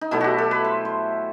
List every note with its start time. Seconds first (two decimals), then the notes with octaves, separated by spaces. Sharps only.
0.01 D#4
0.11 B2 F#3 A3 E4
0.21 F#4 G4
0.38 A4
0.51 B4
0.65 C5
0.85 C5